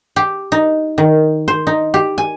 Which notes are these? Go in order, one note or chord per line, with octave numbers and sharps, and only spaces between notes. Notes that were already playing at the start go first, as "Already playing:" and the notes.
G4
D#4
D#3
C5
D#4
G4
G#5